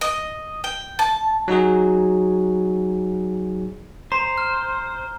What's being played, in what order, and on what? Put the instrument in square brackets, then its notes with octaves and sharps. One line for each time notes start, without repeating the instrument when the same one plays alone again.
[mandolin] D#5
G5
A5
[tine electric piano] F#3 D#4 F#4 G#4
[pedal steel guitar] C5 [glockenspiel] A#5
[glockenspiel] F6